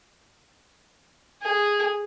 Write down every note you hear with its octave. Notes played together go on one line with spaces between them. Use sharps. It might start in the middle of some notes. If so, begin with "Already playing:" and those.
G#4